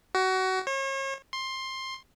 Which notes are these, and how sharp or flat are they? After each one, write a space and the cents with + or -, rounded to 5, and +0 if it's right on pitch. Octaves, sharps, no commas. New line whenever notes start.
F#4 +25
C#5 -40
C6 +15